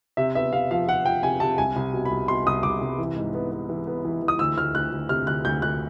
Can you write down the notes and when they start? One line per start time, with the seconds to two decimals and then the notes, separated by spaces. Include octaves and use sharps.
0.17 C3 E5
0.35 B3 E5
0.52 C3 F5
0.71 F3 F5
0.88 F3 F#5
1.05 F3 G5
1.23 C3 G#5
1.40 C3 A5
1.58 C2 G#5
1.76 C2
1.93 B2
2.05 B5
2.11 C2
2.28 B2 C6
2.46 C2 D#6
2.63 C2 D6
2.81 C2
2.98 E3
3.16 G#2
3.34 B3
3.51 B3
3.69 E3
3.87 B3
4.05 E3
4.22 E3
4.28 D#6
4.39 D2 E6
4.57 D2 F6
4.74 D2 F#6
4.92 D2
5.09 C3 F6
5.27 D2 F#6
5.45 D2 G6
5.62 D2 F#6